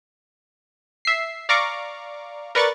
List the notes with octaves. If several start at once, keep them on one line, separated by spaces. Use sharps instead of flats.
E5 C7
D5 F5 A#5 C#6 D6
A#4 B4 D5 C#6 F#6 A6